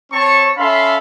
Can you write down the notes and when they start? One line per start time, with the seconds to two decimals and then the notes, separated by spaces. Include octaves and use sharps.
0.13 C4 C#5 A5 C#6
0.58 C#4 A4 E5 F5 B5 C6